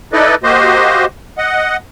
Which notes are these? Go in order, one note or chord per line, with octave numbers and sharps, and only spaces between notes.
D#4 E4 A4 B4 D5 D#5
A#3 F#4 G4 C5 D#5
D#5 F#5